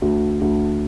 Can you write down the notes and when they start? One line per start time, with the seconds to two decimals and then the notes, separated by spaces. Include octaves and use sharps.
0.02 D2
0.41 D2